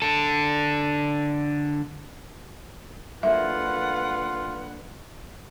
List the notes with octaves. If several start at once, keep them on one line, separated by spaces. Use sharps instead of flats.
D3 A4
F#2 D3 A#3 F4 B4 E5 F#5